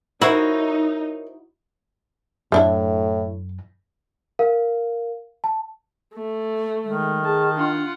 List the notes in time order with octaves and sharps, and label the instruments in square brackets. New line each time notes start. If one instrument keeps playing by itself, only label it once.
[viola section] D#4 [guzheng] E4 F#4 [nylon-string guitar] A#4 C5 C#5
[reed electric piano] F#2 [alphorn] A2 [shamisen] A3 D4 E4
[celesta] A#4 F5
A5
[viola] A3
[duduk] D#3 [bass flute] G#3
[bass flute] G#4 [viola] A5
[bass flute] D4 [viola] F4 F#5